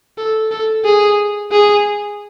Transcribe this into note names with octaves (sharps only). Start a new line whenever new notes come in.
A4
A4
G#4
G#4